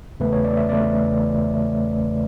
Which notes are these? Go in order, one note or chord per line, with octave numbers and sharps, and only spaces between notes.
E2 C#3 E3 A3 B4
C#5
D5
E5
E2 C#3 E3 A3 D5